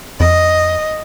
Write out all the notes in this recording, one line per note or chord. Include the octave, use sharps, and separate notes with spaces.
F2 D#5